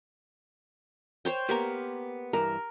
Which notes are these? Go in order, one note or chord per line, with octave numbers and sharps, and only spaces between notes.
C5 C#5 G5
A#3 B3 G4 A#4
G2 E3 A#4